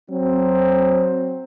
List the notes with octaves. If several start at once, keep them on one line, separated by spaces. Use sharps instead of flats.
F#3 C4